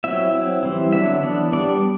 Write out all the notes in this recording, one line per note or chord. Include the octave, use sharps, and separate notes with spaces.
F#3 C4 E4 E5
F#3 C4 E4
E3 G3 C4 E4
D3 F#3 B3 D4 E5
E3 B3 D4
G3 B3 D4 D5